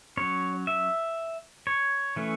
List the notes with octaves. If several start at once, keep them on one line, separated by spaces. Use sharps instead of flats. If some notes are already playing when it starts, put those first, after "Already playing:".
F#3 C#4 C#5
E5
C#5
E3 A3 C#4